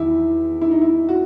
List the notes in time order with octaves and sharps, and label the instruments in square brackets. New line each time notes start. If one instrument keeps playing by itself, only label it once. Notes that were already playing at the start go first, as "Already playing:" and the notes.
Already playing: [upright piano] E2 D#3 F#3 E4
E4
D#4
E4
F#4